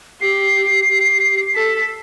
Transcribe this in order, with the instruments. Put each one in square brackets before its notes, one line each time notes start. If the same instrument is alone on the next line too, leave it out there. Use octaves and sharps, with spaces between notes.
[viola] G4 [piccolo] C7
[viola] G4
[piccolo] C7
[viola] A4 [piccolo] B6